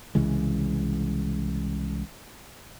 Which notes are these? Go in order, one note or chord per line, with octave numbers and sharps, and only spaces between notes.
C2 C#3 E3 G#3